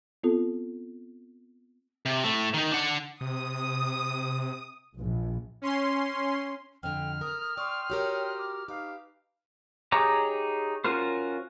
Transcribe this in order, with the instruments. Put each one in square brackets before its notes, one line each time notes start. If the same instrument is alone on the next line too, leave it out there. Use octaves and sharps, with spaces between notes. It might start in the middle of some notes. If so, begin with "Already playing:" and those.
[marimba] B3 C4 F4 A4
[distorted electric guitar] C3
A2 A3
D#3 D#4
D4 F#5
[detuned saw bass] C3 [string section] D#6
[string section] A#1
[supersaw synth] C#4 C6
[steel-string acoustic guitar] F2 D3 [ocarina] G5 [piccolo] F6
[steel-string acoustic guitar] A#4 [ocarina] D#6
[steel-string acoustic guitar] D5 [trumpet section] G5 C6 D#6 [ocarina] C#6
[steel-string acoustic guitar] F#4 G4 A#4 [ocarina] C#5
[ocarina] D6
[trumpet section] D#4 B4 F5 [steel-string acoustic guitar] G4
[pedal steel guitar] D#4 G4 G#4 C#5 A#5
C#4 F4 F#4 A#4 C5